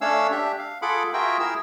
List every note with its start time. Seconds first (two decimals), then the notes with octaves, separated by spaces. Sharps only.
0.01 A3 C#4 D4 C#5 F5 E6
0.32 D4 G4 E5
0.59 F5
0.82 F4 G#4 A4 F#5 B5 D6
1.13 F4 F#4 G#4 A#4 E5 G5
1.40 E4 G#4 A#4 E6